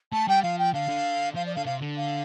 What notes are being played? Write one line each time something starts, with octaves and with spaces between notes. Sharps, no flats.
A3 A5
G3 G5
F3 F5
G5
D3 F5
D3
F3 F5
D5
D3 F5
C3 F5
D3
F5